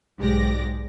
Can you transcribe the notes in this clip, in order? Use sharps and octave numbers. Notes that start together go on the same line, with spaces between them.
B1 G#2 G#3 G4 D5 A#6